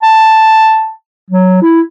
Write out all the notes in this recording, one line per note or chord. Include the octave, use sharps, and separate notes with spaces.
A5
F#3
E4